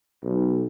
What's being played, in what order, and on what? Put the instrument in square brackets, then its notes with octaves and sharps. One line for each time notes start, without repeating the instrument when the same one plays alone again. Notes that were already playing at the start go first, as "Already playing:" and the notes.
[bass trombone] B1